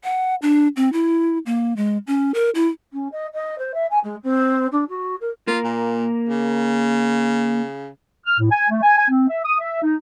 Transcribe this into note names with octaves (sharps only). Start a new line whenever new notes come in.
F#5
D4
C4
E4
A#3
G#3
C#4
A#4
E4
C#4
D#5
D#5
C5
E5
G#5
G#3
C4
D4
F#4
A#4
A#3 F4 A#4
A#2
C#3
F6
A2
G#5
A3
G#5
G#5
C4
E5
D#6
E5
D#4